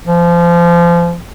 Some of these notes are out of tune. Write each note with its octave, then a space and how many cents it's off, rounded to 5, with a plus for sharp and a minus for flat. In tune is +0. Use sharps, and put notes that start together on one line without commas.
F3 -25